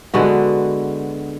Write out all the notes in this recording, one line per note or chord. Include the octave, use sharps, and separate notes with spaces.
D3 G#3 B3 F#4